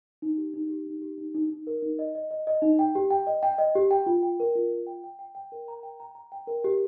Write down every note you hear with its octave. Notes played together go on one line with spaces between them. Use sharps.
D#4
G4
D#4
G4
D#4
G4
D#4
D#4
D#4
A#4
D#4
D#5
D#5
D#5
D#5
D#4
G5
G4
G5
D#5
G5
D#5
G4
G5
F4
G5
A#4
F4
F4
G5
G5
G5
G5
A#4
A#5
G5
A#5
A#5
G5
A#4
G4